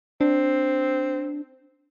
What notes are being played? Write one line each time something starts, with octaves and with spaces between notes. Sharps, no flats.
C4 D4